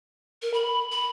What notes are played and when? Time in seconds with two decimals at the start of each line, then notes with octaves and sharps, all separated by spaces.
0.42 A#4
0.54 B5
0.92 B5